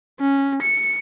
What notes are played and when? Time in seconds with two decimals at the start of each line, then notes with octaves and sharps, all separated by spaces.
0.20 C#4
0.62 C#7